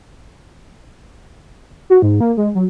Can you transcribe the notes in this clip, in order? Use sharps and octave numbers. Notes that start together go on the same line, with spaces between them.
F#4
G#2
A#3
G#3
F#3